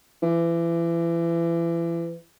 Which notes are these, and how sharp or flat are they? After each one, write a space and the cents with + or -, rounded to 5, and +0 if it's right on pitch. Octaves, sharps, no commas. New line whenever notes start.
E3 +30